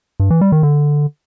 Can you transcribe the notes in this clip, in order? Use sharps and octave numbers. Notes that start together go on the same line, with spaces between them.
G2
E3
G3
D#3
D3